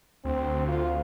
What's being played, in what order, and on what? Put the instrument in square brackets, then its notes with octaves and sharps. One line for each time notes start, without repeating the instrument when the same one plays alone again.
[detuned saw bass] D2 [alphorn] C4
[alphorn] F4